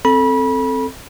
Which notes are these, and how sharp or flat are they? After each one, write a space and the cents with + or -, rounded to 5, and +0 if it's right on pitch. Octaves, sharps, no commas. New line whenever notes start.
C4 +0 A4 +0 B5 -30